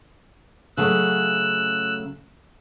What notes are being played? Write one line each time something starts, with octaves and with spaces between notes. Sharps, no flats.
C#3 F#3 A3 E6 F#6